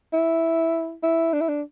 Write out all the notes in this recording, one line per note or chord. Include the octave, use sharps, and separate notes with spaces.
E4
E4
D4
E4
D4